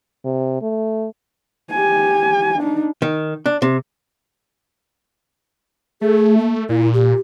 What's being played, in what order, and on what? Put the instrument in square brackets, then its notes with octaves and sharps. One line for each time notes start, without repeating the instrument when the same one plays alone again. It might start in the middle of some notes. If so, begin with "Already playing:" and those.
[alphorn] C3
A3
[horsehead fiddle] G4 G#5
D4 D#4
[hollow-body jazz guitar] D#3
D4
C3
[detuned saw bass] A3 [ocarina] G#4
[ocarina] A#3
[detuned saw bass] A#2 [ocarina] E4
[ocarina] G4